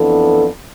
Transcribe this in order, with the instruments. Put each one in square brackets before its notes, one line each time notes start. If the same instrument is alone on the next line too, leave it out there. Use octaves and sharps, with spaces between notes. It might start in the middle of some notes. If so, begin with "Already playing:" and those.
Already playing: [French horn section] F2 E3 B3 D4 A4